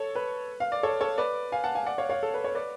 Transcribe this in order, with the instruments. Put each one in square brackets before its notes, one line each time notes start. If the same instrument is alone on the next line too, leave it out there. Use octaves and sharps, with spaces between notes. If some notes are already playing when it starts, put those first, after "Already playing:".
Already playing: [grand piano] A4 C#5
B4
F5
D5
A4 C#5
A4 C#5
B4 D5
F5 G#5
F#5 A5
F5 G#5
D5 F#5
C#5 F5
C#5 F5
A4
B4
C#5
B4 D5